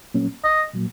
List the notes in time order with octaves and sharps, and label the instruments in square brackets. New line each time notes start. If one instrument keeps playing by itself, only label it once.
[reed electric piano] A#2 F#3 A#3 C#4
[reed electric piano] C2 [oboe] D#5
[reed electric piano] A#2 F#3 A#3